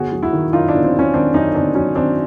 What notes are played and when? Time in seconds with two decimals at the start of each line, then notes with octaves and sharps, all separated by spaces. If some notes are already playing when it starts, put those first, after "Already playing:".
Already playing: G1 F#4 G#4
0.12 F#3
0.23 E4 F#4
0.33 D#3
0.53 F#2 D#4 F4
0.68 G1 D4 E4
0.84 C4
0.94 F#3
0.99 C#4
1.14 D#3 C4 D4
1.34 F#2 C#4 D#4
1.55 G1 C4 D4
1.75 F#3 C#4
1.95 D#3 C4 D4